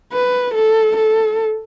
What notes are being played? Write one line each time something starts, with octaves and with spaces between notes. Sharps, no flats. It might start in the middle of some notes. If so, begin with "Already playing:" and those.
B4
A4
A4